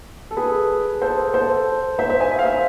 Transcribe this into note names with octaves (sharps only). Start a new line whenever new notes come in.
A4
G#4 B4
A4 C5
A4 C5
C5 E5
C5 E5
E5 G#5
E5
F5
C5 E5